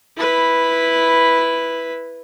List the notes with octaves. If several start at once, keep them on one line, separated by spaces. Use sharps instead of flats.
E4 B4